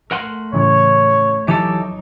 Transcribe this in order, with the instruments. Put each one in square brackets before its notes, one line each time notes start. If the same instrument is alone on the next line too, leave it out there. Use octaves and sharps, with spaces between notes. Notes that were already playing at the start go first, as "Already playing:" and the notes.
[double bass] A3 [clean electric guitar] A#4 F#5 C6
[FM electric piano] A2 C#3 E3 [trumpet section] C#5
[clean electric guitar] E3 G4 A4 [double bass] F#3 D#4 [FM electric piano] D6